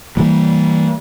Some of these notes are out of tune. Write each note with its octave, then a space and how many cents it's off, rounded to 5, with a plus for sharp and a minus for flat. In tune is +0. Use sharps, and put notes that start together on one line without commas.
E3 -20 G3 -15 A#3 -25